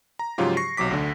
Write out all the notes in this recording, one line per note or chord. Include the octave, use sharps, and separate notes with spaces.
A#5
G#2 C#3 F3 F#3 F4 G4
C#6 A#6 C7
B1 C3 F#3 D6 B6
D2 D3